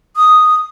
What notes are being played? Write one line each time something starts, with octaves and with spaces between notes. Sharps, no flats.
D#6